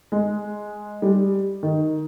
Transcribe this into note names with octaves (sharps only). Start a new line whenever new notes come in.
G#3
G3
D#3